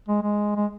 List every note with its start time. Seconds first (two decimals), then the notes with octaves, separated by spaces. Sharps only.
0.08 G#3
0.23 G#3
0.56 G#3